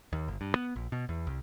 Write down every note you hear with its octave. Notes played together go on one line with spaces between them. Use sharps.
D#2
G1
G2
B3
A#1
B2
E2
C2